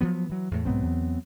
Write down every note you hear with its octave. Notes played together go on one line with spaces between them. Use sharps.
F3 F#3 B3
E3 F#3
E2 A2 A3
B1 G#2 F#3 B3 C4
E2